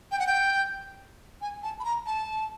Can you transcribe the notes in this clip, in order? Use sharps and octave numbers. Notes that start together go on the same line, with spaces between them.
G5
F#5
G5
G#5
A5
B5
A#5
A5